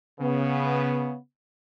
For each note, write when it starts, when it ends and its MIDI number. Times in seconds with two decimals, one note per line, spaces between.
0.21 1.16 49
0.21 1.16 59